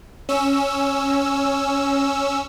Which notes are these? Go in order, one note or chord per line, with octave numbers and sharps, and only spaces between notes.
C#4 E6